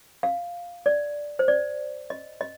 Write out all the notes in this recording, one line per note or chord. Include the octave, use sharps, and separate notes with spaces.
F5
D5
C5
D5
D#5
D#5